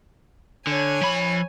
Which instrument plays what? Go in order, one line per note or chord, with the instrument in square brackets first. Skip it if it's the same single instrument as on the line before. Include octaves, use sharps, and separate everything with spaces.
[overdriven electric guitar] D3 [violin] C#5 G#5
[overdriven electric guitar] F3 B5